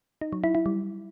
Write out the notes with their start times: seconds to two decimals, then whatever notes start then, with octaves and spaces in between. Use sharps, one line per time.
0.21 D#4
0.33 F#3
0.44 E4
0.55 E4
0.66 G3